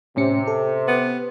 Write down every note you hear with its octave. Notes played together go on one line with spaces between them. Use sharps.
A2 C3 C#4 C#7
A4
B3